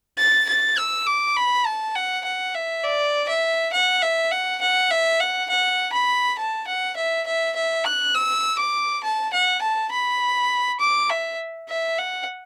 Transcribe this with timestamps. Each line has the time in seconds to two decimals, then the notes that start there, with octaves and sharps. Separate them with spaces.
0.19 A6
0.49 A6
0.77 E6
1.07 D6
1.37 B5
1.66 A5
1.95 F#5
2.25 F#5
2.55 E5
2.84 D5
3.29 E5
3.73 F#5
4.02 E5
4.31 F#5
4.61 F#5
4.91 E5
5.20 F#5
5.50 F#5
5.93 B5
6.38 A5
6.67 F#5
6.96 E5
7.26 E5
7.56 E5
7.85 F#6
8.15 E6
8.59 D6
9.03 A5
9.33 F#5
9.62 A5
9.92 B5
10.80 D6
11.10 E5
11.69 E5
11.98 F#5